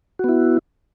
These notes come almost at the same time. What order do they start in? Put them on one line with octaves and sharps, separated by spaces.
F#4 B3 E4